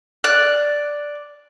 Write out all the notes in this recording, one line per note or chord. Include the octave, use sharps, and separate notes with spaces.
D5 F#6